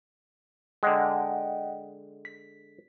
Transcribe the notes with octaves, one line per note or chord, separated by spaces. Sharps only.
D3 G#3 D#5 F#5 G5
B6